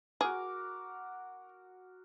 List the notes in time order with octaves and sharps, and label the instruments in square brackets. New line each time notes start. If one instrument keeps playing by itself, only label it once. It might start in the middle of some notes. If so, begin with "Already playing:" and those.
[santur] F#4 A#4 D6 [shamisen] G#4